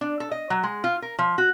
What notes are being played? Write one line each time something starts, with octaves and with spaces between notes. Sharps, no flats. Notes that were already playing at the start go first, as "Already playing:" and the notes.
D4
A4
D#5
F#3
G#3
F4
A#4
F3
F#4